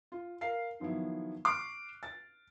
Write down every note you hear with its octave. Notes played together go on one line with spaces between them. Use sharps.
F4
A#4 F5 C7
D#3 F3 F#3 B3 E4
C#6 D6 F6 F#6 C7
A6